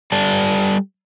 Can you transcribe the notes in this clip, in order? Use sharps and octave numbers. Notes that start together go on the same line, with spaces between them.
G3 A4 D5 A5